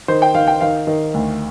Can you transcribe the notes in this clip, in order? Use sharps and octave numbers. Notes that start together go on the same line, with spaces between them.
D#3 C5
G5
D#3 F5
G5
D#3 F5
D#3
D2